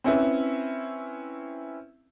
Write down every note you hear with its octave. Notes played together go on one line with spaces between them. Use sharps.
C4 C#4 E4 B4